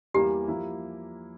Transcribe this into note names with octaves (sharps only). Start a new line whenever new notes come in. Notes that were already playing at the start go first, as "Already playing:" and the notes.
E2 E3 G3 A#3 G4
F3 A#3 E4